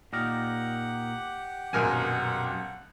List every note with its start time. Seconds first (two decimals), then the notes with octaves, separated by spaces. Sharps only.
0.13 A#2 D#4 G4 A#4 F#5
1.73 A#1 F#2 B2 G#3 A#4 G#5
2.46 F#5